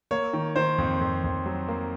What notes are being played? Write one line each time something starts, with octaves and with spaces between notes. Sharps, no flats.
A#3 C#5
D#3
D#3 C5
F2
F2
F2
F#3
A#3